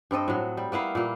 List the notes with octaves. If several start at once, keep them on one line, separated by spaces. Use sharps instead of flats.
G2 C4 A4 D#5
A2 F#3
G3
A#3 B3 E4 F5
A#2 A#3